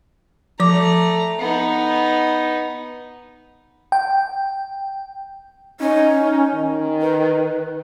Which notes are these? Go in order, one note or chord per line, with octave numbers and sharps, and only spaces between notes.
F3 A3 A#5 D6
B3 D#4
G5
C#4 D#4
D#4
D#3
B4